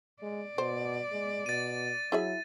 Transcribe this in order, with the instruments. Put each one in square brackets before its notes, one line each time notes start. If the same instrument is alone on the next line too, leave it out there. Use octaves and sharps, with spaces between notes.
[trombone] G#3 [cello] D5
[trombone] B2 [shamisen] C5
[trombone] G#3
[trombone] B2 [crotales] A6 D#7
[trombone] F#3 [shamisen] E4 G#4 E5